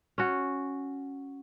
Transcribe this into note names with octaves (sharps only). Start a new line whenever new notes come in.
C#4 F#4